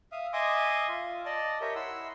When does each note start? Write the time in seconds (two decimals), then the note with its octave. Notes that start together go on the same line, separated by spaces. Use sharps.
0.12 E5 F5 D#6
0.33 D#5 E5 G#5 C6 D6 D#6
0.88 F4
1.26 D5 D#5 A5
1.61 G4 A#4 C#5 D#5 E5
1.75 E4 F#5 C6 E6